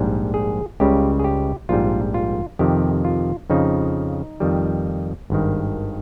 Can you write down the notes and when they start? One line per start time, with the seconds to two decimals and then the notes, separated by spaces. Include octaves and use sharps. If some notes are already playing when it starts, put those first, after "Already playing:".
Already playing: A#1 G#2 G3
0.34 G#4
0.80 C#2 C#3 G3 G4
1.19 G#4
1.24 G4
1.69 A#1 G#2 G3 F4
2.14 F4
2.59 F2 C3 D#3 G4
3.05 F4
3.50 F2 C#3 F3 D#4
4.40 F2 D#3 G3
5.30 G#1 G2 D#3